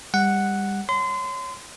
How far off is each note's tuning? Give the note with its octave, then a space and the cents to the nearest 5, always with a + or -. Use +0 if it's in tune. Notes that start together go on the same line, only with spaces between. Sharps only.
G3 +25 F#5 +0
C#5 +10 C6 -30